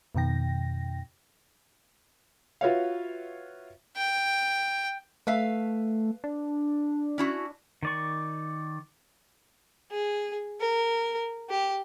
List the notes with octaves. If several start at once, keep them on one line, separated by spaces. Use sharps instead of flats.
F2 B2 D#3 G5 A#6
F4 F#4 B4 C#5 E5 F5
G5
A3 B4 E5 F5
D4
C#4 E4 F#4
D#3 D5 C#6
G#4
A#4
G4